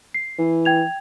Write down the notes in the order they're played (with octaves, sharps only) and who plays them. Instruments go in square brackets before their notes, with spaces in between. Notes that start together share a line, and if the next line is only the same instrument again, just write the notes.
[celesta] C7
[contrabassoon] E3
[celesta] G5 G#6 F7